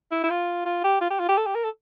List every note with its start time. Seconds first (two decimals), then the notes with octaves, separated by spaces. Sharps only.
0.12 E4
0.24 E4
0.30 F4
0.65 F4
0.84 G4
1.01 F4
1.10 G4
1.20 F4
1.29 G4
1.37 A4
1.46 G4
1.55 A#4
1.64 A4